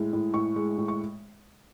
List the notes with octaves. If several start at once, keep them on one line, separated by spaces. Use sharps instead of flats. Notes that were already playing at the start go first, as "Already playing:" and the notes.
Already playing: A2 G#3
A2
A2 C#6
G#3
A2
C#6